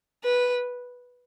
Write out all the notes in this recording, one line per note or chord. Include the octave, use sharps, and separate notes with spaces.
B4